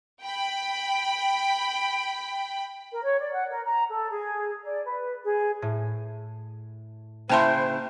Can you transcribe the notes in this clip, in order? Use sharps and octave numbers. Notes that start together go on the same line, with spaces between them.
G5 B5
A#4
C#5
D5
F#5
A#4
A#5
A4
G#4
D5
B4
G#4
A2
C#3 A#3 E4 C5 G5 A5 C6 C#7